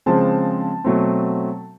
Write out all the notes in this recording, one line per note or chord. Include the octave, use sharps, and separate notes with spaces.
C#3 F3 G#3 C4 A5
B2 F#3 A3 C4